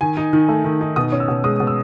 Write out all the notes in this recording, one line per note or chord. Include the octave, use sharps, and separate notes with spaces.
D#3 G#5
D#4
D#3
A3
D#3
D#4
B2 D#6
C#4
E6
B2
G#3 D#6
B2
E6